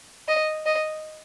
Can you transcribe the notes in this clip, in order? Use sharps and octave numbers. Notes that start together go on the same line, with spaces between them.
D#5
D#5